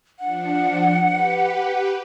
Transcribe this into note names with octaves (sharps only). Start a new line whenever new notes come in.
F3 D4 F#5
G4 B4